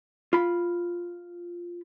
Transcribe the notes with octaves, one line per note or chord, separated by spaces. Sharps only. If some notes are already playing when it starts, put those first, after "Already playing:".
F4 B5